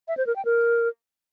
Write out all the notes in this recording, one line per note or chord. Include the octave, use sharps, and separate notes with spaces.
E5
C5
A#4
G5
A#4